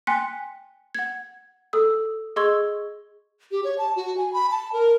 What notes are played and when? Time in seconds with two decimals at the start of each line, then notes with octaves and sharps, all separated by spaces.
0.07 G5 G#5 C6 F#6 B6 C#7
0.95 F#5 G#6
1.73 A4 D#6 E6
2.36 G#4 D#5 C6 C#6 E6 G#6
3.51 G4
3.64 C#5
3.78 A5
3.96 F#4
4.17 G#5
4.33 B5
4.51 A5
4.73 A#4